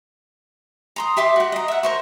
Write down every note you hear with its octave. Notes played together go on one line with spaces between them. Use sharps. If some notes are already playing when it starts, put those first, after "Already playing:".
A#5 C6 D#6
G4 E5 C6 D6
F#4 F#5
D#5 A#5
E5 F#5
A#4 C5 C#6